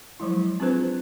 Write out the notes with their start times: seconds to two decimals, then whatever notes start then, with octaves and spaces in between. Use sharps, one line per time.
0.20 F3 F#3 G#3 E4
0.60 C4 D4 F4 G#4 B4 C5